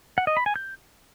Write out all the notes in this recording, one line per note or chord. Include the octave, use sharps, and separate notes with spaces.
F#5
D#5
B5
G#5
G6